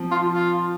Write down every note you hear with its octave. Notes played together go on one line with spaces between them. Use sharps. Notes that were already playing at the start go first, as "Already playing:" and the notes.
Already playing: F3 C4
F4
F4